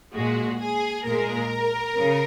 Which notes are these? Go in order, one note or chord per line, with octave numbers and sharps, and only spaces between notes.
A#2 G#3 F#4
G#4
A#2 G#3 A#4
C#3